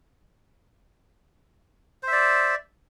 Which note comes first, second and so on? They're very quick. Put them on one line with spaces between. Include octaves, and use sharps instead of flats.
C5 E5 D5